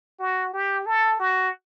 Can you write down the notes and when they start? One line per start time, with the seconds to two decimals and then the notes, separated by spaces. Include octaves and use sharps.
0.19 F#4
0.54 G4
0.86 A4
1.19 F#4